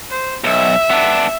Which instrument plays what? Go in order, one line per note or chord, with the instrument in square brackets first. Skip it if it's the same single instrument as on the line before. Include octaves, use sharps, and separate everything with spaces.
[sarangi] C5
[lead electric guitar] B1 [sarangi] E5
[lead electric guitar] B3 D4